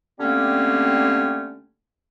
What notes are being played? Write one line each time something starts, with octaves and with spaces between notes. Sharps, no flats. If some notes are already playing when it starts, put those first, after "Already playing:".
D3 G3 A3 A#3 C4 C#4